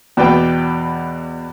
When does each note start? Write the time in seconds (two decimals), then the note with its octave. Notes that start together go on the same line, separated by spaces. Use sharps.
0.17 E2 B2 B4 D5 G5